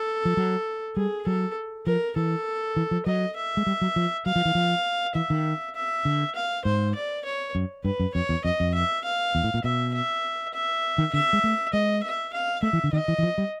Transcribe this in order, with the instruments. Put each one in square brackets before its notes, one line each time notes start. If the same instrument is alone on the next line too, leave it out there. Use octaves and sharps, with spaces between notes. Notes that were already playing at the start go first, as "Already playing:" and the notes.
Already playing: [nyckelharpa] A4
[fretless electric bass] F3
F#3
[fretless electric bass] G3 [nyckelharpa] G#4
[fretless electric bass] F#3 [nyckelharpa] A4
[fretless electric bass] F3 [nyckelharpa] A#4
[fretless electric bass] E3 [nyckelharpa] A4
[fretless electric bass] E3
F3
[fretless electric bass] F#3 [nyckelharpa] D#5
[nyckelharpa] E5
[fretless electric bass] G#3
G3
F#3
F3
[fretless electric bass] F#3 [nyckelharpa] F5
[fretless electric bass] F3
E3
F3
[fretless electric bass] E3 [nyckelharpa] E5
[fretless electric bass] D#3
[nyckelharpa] E5
[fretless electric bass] D3
[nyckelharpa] F5
[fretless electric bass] G#2 [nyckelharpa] C5
[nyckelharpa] D5
C#5
[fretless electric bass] F#2
[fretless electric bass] G2 [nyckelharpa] B4
[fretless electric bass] F#2
[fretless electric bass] F2 [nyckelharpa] C#5
[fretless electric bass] E2
[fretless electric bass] F2 [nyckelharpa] D#5
[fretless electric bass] F2
[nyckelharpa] E5
F5
[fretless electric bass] E2
A2
A#2
[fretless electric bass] B2 [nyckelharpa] E5
[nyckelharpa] E5
E5
[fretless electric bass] D#3
[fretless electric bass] D3 [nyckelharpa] E5
[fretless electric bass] G#3
A3
[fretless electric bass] G#3 [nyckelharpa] D#5
[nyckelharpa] E5
F5
[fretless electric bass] A3 [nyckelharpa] E5
[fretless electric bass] E3
D3
[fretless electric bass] D#3 [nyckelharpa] D#5
[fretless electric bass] E3
E3
F3
G3